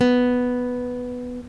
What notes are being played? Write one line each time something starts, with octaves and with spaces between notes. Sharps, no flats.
B3